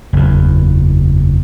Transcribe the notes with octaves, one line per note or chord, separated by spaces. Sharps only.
F#1 E2